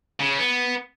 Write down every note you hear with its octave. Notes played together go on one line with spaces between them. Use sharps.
C#3
B3